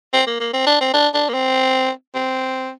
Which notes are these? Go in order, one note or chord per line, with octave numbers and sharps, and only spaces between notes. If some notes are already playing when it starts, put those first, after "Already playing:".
C4
A#3
A#3
C4
D4
C4
D4
D4
A#3
C4
C4